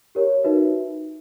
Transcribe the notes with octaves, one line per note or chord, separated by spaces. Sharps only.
G4 A#4 C#5
D#4 F#4 B4 E5